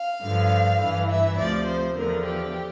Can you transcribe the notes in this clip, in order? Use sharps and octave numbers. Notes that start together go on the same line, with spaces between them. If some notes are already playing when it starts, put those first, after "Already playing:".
Already playing: F5
G2 D3 F3
G2 E3
E5
D2 C3 F3 D5
C5
E2 D3 F3 A#4
G4